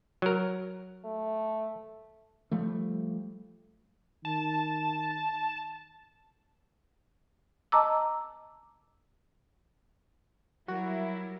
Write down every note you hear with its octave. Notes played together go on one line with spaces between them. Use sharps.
F#3 A#4
A3
F3 G3 A3
D#3 A5
D#5 A5 A#5 D6 E6
F#3 G3 E4 F#4 A#4